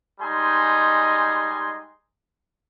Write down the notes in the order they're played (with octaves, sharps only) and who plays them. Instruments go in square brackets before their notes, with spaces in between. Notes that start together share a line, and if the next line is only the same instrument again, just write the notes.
[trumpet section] G3 G#3 D#4 G#5 C6